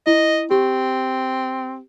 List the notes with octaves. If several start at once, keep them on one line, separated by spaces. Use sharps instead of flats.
E4 D#5
C4 G4